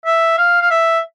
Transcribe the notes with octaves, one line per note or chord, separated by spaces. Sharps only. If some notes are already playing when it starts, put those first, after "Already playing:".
E5
F5
F5
E5